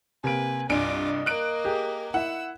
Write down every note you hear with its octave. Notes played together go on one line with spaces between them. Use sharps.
C3 A#3 B4 G#5 D7
C2 G2 F4 D#5 G#5 D6 D7
A#3 A#4 F#6 D7
G4 G#4
E4 E5 F#5 E6